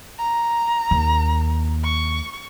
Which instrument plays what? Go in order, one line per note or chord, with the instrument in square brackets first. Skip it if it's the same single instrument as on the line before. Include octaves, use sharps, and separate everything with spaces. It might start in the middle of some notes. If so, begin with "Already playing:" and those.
[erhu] A#5
[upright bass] D#2
[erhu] C#6